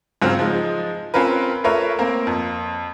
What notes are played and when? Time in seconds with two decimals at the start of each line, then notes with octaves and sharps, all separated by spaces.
0.22 G#2 C#3 F#3 C4 F4
0.39 F3 G#3 D#4
1.14 C4 C#4 F4 A#4 B4
1.64 A3 F4 A#4 B4 C#5 E5
1.99 A#3 C4 A#4
2.27 F2